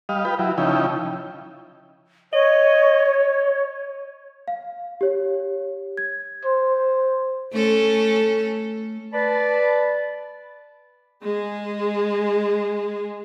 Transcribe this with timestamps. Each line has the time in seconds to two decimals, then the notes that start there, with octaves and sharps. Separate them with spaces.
0.09 G3 D#5 F5
0.25 F4 B4 G5
0.39 F#3 E4
0.58 C#3 F3 D#4 E4 G5
2.33 C#5 D#5
4.48 F5
5.01 G4 C#5
5.97 G#6
6.45 C5
7.52 A3 C#4 A4
9.14 B4 D5 A5 B5
11.23 G#3 G#4